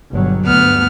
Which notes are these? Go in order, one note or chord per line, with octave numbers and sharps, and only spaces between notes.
G1 B2 F#3
D2 G2 B3 F6